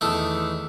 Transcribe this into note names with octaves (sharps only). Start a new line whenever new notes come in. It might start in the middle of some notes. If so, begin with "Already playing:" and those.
E2 D#3 A3 A4